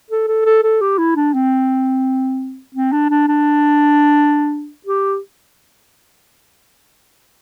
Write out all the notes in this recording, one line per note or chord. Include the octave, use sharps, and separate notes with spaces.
A4
A4
A4
A4
G4
E4
D4
C4
C4
D4
D4
D4
G4